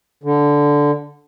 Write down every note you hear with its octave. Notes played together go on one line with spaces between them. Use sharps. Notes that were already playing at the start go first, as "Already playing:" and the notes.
D3